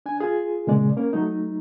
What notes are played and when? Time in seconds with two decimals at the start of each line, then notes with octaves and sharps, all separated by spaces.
0.06 D4 G#5
0.20 F4 G#4
0.67 A#2 C#3 G#3 D5
0.97 A#3 C#4 A#4
1.13 F#3 A3 D#4